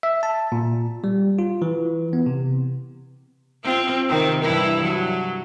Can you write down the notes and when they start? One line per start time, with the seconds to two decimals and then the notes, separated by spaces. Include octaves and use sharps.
0.03 E5
0.23 A5
0.52 A#2
1.04 G3
1.39 F4
1.62 E3
2.13 B3
2.26 C3
3.64 C4 F4
4.09 C3 D#3 C4
4.43 G2 E3 E4
4.82 F#3